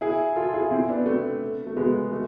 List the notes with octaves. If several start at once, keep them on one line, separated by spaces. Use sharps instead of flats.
E4 G#4
F4 A4
E4 G#4
C4 E4
B3 D4
A3 C4
A3
G#3 B3
A3